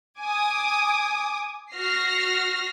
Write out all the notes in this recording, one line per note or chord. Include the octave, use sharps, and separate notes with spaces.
G#5 D6 D#6
F#4 F6 A#6 C7